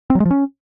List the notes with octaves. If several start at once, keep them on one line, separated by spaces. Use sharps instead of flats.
C4
F#3
G#3
F3
C#4